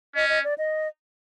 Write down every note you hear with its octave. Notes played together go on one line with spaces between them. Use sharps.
C#4 D#5
D#5
D5
D#5